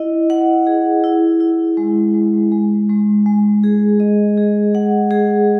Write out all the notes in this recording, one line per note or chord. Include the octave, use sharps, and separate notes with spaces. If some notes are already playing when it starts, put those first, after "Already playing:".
Already playing: E4 D#5
F#5
G#4
E4
E4
G#3
G#3
G#3
G#3
G#3
G#4
D#5
G#4
F#5
G#4